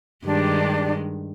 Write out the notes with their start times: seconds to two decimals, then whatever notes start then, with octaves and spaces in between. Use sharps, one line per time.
0.25 G2 D#3 G#3 D4 G4